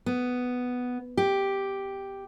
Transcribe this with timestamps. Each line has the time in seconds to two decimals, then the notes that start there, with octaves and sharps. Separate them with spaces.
0.06 B3
1.17 G4